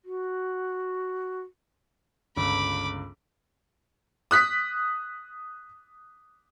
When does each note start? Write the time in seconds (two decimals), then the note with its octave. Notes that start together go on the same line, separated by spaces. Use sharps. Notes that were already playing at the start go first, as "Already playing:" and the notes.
0.05 F#4
2.37 G1 C#2 B5 D6
4.31 D#6 F#6 B6